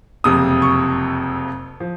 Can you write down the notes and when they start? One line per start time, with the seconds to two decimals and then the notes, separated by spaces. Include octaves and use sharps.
0.24 F#1 F2 C3 D#6
0.62 C#6
1.80 F3